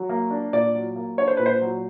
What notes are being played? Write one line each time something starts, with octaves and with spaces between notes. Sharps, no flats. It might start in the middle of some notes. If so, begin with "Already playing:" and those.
Already playing: F#3
A#3
D4
A#2 D5
F#3
A#3
D4 C#5
C5
A#2 B4
C5
F#3